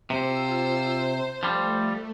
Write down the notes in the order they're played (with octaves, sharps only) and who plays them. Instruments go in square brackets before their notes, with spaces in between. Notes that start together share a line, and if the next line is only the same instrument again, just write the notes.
[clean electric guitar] C3 [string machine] F4 E6 [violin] C5
[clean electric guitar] F3 G3 [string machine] A3